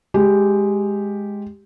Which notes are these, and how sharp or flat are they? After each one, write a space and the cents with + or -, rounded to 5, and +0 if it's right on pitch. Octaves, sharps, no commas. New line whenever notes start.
G#3 +0 G4 +0